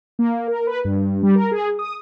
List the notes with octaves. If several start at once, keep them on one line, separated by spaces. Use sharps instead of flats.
A#3
A#4
B4
G2
G3
A#4
G#4
D#6